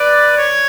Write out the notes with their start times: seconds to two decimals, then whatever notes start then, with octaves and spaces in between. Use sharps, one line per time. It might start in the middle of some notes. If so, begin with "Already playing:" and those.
Already playing: B4 D5
0.38 C#5